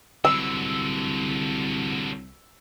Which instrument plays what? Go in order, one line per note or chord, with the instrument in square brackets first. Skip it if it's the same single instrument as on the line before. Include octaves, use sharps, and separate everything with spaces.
[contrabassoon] C2 [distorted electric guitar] D3 F#3 [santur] E6